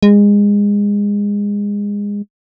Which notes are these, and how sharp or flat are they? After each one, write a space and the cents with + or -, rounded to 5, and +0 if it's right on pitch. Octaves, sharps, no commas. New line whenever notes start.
G#3 -25